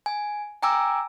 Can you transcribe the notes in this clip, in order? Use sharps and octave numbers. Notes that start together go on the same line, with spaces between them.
G#5
G5 G#5 A#5 D6 E6